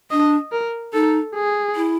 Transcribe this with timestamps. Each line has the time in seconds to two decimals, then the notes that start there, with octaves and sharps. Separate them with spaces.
0.11 D4 D#5
0.52 A#4
0.94 D#4 A4
1.35 G#4
1.76 E4